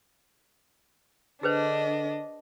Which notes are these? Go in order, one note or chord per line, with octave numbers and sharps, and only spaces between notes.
D3 D4 G#4 B4 C5 D#5